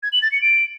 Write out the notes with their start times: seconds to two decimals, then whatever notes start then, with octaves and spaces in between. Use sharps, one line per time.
0.03 G#6
0.12 F#7
0.22 A6
0.32 C#7
0.41 D7